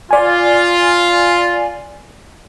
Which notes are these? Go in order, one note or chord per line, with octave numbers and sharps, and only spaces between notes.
F4 D5 G#5